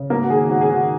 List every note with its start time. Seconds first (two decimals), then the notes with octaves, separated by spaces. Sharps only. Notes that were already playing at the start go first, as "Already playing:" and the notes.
Already playing: C#3
0.10 G#2 A#3
0.23 F#4
0.30 D#3 G#4
0.50 G#2 F#4
0.61 G#4
0.70 D#3 F#4